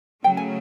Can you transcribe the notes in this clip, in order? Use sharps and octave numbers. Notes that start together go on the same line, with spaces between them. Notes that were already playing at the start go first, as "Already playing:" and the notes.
C#3 F#3 A3 G5
G#5